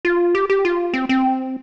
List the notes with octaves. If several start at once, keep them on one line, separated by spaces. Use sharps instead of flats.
F4
G4
G4
F4
C4
C4